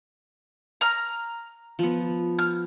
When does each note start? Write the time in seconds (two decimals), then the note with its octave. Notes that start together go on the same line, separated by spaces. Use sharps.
0.81 A#5 F6
1.79 F3 B3
2.39 F6